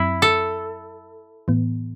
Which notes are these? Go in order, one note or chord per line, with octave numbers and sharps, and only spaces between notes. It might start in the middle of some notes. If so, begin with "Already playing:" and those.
Already playing: F#2 F#3 C4 E4
A4
A2 E3 B3